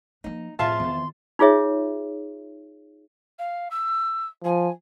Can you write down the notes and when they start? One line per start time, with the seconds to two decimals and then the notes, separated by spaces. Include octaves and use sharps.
0.24 F3 A#3 D#4
0.59 F2 A2 F4 G#4 E5 F5 A5 C6
0.80 E2 D#3
1.39 D#4 F4 G#4 C#5 E5
3.38 F5
3.70 E6
4.44 F3 G#5